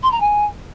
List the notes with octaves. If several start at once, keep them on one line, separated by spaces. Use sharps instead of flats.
C6
A#5
G#5